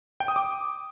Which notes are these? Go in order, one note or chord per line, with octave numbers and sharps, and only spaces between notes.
G5
D#6
D6